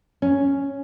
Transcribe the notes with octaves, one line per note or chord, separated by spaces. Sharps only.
C#4